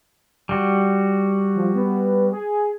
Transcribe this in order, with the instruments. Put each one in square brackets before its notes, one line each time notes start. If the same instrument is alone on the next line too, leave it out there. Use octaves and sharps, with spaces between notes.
[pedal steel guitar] G3 F#4
[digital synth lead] F3
B3
G#4